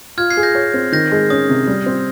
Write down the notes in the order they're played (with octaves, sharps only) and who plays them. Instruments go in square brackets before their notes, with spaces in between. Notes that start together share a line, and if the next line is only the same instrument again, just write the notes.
[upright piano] F4 [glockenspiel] F6 G#6
[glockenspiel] G#6 C7
[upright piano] G#4
[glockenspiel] G6 A#6
[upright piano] C#5
C4
[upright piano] D#3 [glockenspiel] G6 A#6
[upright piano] G#3
[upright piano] C#4 [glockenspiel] D#6
[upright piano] C3
G3
C4